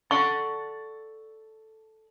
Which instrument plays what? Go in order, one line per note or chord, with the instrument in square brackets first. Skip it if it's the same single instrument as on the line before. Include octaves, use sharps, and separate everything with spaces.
[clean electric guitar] A4 D5 F#5 [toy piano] C#6